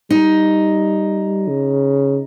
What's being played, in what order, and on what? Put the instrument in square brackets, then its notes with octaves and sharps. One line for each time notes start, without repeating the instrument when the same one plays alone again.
[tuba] G3 [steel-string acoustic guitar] D#4
[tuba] C#3